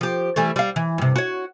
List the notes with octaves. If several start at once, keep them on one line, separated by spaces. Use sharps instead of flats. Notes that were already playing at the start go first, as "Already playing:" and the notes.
F3 G4
E3 G3 A3
G3 F5
E3
G2 C3
F#4 C#5